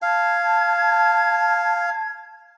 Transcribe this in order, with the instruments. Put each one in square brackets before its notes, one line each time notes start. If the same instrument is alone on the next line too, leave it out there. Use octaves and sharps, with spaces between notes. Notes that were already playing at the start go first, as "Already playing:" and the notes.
[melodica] F5 [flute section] A5 G#6